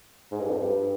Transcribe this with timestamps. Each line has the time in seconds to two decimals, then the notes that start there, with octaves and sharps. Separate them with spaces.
0.31 G#2
0.40 G2
0.49 F2
0.57 G2